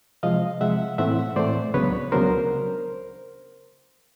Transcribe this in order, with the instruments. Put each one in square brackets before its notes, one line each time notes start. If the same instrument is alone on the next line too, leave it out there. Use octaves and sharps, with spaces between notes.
[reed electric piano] C3 F3 G#3 D#5 F5
C3 F3 G#3 E5 F#5
A2 E3 A3 C4 E5 F#5
A2 E3 A3 C4 C5 D5
C#2 C#3 F#3 B3 D4 B4 C#5
C#2 C#3 F#3 B3 D4 A#4 C5